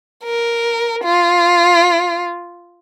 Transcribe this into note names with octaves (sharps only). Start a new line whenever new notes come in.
A#4
F4